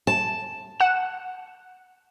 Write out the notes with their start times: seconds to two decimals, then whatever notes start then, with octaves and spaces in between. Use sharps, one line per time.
0.07 A5
0.80 F#5 E7